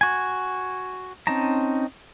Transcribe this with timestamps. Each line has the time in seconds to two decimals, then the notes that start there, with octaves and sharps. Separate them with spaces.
0.01 F#4 G#5
1.27 C4 C#4 D#4 A5 A#5